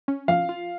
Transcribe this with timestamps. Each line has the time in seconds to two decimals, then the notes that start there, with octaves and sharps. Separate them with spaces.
0.08 C#4
0.28 F3 F5
0.49 F4